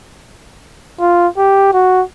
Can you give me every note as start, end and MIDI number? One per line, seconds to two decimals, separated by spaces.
1.00 1.28 65
1.37 1.69 67
1.73 2.02 66